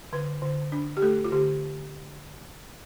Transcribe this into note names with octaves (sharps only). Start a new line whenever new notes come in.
D3 B4
D3
D4
G4
A3 A4
F4
D3 G4